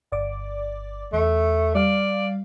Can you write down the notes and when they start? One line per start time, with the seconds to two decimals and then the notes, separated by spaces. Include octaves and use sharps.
0.12 G1 D5 D6
1.13 E2 A3
1.75 G3 D5 F5